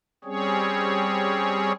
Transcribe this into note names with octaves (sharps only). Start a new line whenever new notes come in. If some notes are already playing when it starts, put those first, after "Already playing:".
G3 C4 C#4 G#4 C#5